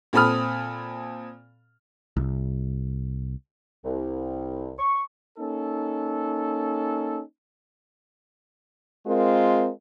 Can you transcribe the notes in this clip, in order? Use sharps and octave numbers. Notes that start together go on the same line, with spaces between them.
A#2 C4 A4 B5 D#6 F6
C2
C2
C#6
A#3 C#4 D#4 A4
G#3 C4 F4 A#4